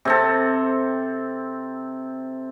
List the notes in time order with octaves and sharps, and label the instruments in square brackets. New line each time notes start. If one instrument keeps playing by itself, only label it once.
[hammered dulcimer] C3 C4 A4